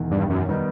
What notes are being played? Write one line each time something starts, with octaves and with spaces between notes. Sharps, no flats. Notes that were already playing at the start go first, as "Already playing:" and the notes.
Already playing: E1 E2 D#3
G2
F#2
D#3 G3 B3 D#4